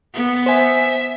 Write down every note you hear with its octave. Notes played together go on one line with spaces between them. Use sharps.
B3
C5 E5 G#5 B6